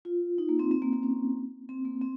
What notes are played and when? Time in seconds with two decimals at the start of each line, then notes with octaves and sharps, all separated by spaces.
0.05 F4
0.38 D#4
0.49 A#3
0.59 C4
0.71 C4
0.82 A#3
0.93 C4
1.03 C#4
1.69 C4
1.85 A#3
2.01 C4